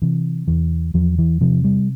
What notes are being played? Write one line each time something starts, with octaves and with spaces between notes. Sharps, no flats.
C3 E3
E2 E3
E2 F3
E3
C3 F3
G3